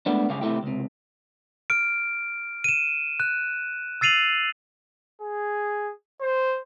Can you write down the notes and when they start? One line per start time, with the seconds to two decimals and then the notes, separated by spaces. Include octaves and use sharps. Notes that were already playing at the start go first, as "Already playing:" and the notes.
0.06 G#3 A3 B3 D4
0.29 C#2 G2 C#3 G4 F5
0.41 C3 E3 F#3 A3 E4 G4
0.63 C#2 C3
1.70 F6 D7
2.64 D#7 E7
3.20 F#6
4.01 E6 A6 C7 D#7 F7 F#7
5.21 G#4
6.21 C5